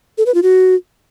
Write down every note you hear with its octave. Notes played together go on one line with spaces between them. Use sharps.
A4
B4
F4
F#4